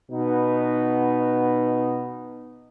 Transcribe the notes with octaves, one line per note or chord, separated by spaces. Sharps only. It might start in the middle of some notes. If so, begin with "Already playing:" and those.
B2 B3 D#4